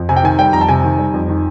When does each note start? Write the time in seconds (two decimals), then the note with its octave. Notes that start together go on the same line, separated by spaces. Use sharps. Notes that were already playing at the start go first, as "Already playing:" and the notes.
Already playing: F2
0.09 C3 G#5
0.16 G5
0.23 D#3 G#5
0.39 G3 G5
0.53 F2 A#5
0.61 A5
0.69 C3 G#5
0.84 D#3
0.99 G3
1.14 F2
1.29 D#3